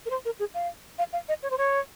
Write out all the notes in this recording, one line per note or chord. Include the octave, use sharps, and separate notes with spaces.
A#4
C5
A#4
G#4
F5
F5
F5
D#5
C#5
C5
C#5